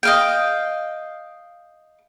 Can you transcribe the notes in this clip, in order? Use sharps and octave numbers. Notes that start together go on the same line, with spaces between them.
D#5 F5 G5